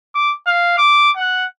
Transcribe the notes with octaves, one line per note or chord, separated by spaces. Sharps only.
D6
F5
D6
F#5